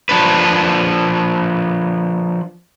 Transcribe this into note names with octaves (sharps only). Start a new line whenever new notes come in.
F3 D4 B4